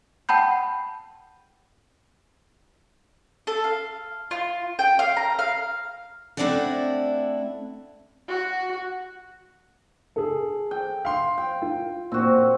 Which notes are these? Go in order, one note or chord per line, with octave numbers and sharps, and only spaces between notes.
F#5 G5 A5 B5 G6
A4
F5
F4
G5
F5
A#5
F5
A3 C4 D4 E4 D5 F#5
F#4
G#4 A4
G5
F5 C6
G5
F4
A#2 C4 F#4